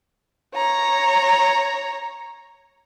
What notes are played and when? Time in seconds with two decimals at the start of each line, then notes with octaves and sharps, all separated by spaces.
0.55 C#5 A#5